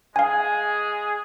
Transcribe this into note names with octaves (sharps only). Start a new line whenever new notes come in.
G#3 G#4 F5 G#5